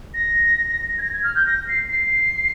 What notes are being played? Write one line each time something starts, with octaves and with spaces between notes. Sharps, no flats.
A#6
G#6
A#6
G#6
F6
G6
A#6
C7
C7